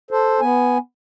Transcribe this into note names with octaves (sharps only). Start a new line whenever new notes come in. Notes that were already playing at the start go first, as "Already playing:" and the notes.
A4 C5
B3 G#5